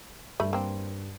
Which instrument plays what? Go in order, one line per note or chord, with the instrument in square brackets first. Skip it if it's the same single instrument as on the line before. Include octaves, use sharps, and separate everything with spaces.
[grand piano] G2 [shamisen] A3 B5
[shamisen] A#3 C4